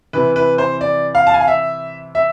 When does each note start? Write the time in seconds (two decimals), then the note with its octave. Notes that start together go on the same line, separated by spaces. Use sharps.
0.13 C3 E3 B4
0.36 B4
0.58 C5
0.81 D5
1.15 F5
1.27 A5
1.34 G#5
1.41 F5
1.48 E5
2.15 E5